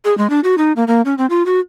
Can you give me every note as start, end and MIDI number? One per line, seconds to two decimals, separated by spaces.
0.05 0.16 68
0.18 0.30 56
0.30 0.40 62
0.44 0.55 66
0.58 0.72 63
0.76 0.84 58
0.87 1.01 58
1.05 1.14 61
1.18 1.26 60
1.30 1.45 65
1.46 1.60 66